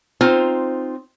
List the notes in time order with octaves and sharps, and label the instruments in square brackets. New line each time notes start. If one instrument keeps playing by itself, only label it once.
[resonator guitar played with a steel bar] C4 D#4 F4 C5